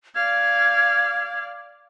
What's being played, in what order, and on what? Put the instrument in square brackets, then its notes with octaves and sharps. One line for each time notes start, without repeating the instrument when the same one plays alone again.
[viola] D5 F5 [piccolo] G#6